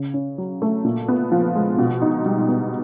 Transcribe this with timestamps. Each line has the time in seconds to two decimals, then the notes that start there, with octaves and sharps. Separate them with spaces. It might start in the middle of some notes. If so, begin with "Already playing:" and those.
Already playing: C#3
0.14 C#4
0.38 F#3
0.62 A3
0.84 A#2
1.08 B3
1.32 F3
1.55 G#3
1.78 B2
2.02 D#4
2.26 G3
2.48 B3